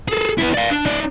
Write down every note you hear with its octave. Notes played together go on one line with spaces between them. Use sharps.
G#4 A4
B3 E4
D5 F5
D4
D#4 D5